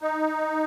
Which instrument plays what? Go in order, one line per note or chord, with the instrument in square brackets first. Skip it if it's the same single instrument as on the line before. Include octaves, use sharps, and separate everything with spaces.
[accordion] D#4